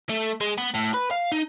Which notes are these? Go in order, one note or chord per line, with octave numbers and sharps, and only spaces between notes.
A3
G#3
B3
A2
B4
F5
D#4